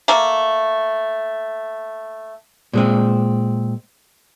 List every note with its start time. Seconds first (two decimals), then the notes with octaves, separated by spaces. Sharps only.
0.08 A3 A#3
2.73 A#2 G#3 C4